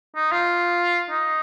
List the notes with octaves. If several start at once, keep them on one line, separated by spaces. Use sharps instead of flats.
D#4
F4
D#4